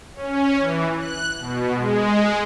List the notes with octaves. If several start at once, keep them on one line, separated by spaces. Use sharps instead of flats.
C#4
E3
F#6
B2
G#3